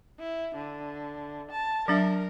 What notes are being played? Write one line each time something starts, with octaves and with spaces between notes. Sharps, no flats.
E4
D3
A5
F#3 D4 A#4 E5